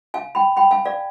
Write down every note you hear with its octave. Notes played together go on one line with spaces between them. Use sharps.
F5 G#5
G5 B5
G5 B5
F5 G#5
D5 F5